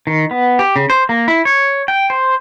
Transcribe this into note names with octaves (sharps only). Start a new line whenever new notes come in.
D#3
B3
G4
C#3
C5
A#3
E4
C#5
G5
C5